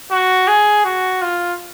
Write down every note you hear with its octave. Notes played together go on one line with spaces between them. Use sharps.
F#4
G#4
F#4
F4